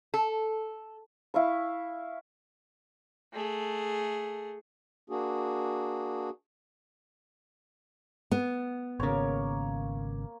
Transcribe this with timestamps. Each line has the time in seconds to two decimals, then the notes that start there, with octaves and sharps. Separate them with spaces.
0.14 A4
1.34 E4 F5 C#6
3.34 A3 G#4
5.10 A#3 D4 F#4 G#4
8.31 B3
9.00 G#1 C#3 A#3 C#5